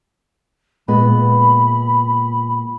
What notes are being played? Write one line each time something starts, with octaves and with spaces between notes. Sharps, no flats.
A#2 G#3 B3 B5